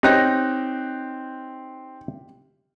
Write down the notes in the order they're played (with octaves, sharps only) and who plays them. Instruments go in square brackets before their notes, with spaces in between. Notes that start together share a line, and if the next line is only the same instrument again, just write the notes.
[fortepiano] C4 [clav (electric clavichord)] D#4 C#5 D#5 [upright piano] G4 F#6 A#6